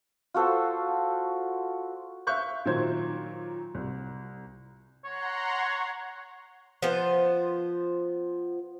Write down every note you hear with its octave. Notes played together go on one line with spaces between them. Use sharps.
F4 F#4 A4 C5
E5 F5 C#6 F#6 G6
A#2 D#3 F#3 C5 G#6
C2
C#5 F#5 A#5 C6
F3 B3 C5